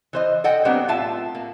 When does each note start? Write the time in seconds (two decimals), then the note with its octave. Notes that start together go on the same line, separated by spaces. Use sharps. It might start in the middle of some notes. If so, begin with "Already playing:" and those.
0.13 E3 C5 D#5
0.44 A4 D#5 F#5 G5
0.65 F#3 B3 C4 D4 G4
0.88 A2 F4 E5 A5
1.35 A#3